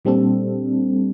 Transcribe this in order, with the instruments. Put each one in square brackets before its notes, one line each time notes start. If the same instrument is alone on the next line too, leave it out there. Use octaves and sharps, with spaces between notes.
[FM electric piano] A#2 G3 C4 D4 A4